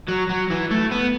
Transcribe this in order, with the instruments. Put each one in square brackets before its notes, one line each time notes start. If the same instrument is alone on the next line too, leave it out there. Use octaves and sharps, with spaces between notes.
[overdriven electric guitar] F#3
F#3
E3
A3
B3